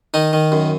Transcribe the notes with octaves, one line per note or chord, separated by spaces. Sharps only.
D#3 D#4
D#3
F#2